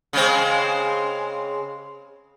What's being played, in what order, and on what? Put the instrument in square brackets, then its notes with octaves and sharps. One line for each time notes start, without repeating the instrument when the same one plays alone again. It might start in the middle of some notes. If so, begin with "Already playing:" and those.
[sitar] C#3 G#3 C4